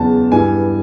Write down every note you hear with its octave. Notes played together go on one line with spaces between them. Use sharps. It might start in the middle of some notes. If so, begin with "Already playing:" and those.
Already playing: E2 C#3 F#3 A5
G2 E3 G3 G#5